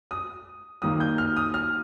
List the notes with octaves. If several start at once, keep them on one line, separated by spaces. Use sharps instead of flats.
D#6
D#2 D#3 A#3 D#6
G6
F6
D#6
F6